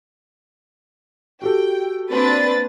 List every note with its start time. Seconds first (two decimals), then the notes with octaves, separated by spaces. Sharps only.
1.42 F#4 G4 A4 G5
2.12 A#3 C4 D4 B4 A6